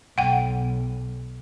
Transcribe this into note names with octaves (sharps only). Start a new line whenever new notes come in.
B1 F#5 G5